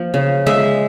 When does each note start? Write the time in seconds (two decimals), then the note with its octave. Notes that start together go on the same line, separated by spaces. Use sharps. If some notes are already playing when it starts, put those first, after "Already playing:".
Already playing: F3 A#3
0.14 C#3
0.46 G#3 E5